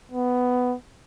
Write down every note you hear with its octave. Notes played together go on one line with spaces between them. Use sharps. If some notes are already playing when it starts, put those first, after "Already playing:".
B3